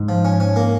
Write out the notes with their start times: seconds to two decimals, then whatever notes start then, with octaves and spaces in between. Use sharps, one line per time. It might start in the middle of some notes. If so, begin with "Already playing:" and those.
Already playing: G#2
0.09 F3
0.25 C#4
0.40 C#4
0.56 A#3